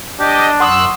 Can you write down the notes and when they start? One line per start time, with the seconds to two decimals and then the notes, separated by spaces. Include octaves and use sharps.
0.20 D4 G4 D#5
0.60 F#2 F#5 C6 C#6 D#6 E6 F#6